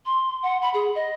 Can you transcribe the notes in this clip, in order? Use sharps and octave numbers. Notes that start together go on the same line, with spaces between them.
C6
F#5
B5
G#4
D#5